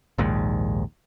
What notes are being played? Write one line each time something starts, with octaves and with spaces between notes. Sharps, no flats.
A#1 D#2 G#2